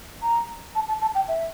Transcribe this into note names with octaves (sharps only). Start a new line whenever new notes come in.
A#5
A5
A5
A5
G5
E5